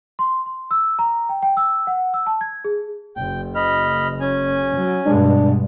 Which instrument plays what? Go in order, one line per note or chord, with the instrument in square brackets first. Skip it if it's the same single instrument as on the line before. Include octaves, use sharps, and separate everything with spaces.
[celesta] C6
C6
E6
A#5
G5
G5
E6
F#5
E6
A5
G#6
G#4
[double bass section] F#1 [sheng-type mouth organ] G5
[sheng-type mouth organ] D#5 B5 F6
C#4 G#5
[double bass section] F#3
[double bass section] G2 B2 G#3 [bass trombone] D4